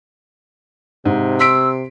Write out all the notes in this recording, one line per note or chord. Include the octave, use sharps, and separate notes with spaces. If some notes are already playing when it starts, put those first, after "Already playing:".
G#2 C3
C6 E6 B6 D7